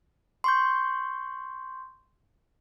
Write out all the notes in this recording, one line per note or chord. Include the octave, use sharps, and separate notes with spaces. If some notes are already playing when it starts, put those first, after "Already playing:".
C6 C#6 G6